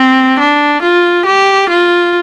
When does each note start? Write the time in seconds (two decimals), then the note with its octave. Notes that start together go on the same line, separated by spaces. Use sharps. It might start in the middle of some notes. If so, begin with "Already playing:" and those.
Already playing: C4
0.40 D4
0.82 F4
1.26 G4
1.70 F4